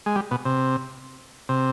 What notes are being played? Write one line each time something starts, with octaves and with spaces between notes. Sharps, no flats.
G#3
G3
B2
C3
C3